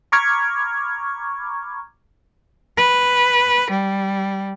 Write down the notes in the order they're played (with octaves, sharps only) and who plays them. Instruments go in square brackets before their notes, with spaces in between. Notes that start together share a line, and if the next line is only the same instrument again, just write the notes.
[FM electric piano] A#5 B5 C#6 D6 F6 G#6
[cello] B4
G3